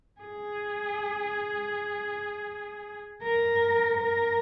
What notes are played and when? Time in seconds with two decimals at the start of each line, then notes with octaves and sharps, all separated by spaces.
0.21 G#4
3.23 A#4
3.97 A#4